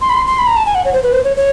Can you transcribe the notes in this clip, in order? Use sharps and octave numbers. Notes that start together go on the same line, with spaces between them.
C6
B5
C6
C6
B5
A#5
A5
G#5
F#5
C#5
C5
B4
C5
C#5
C#5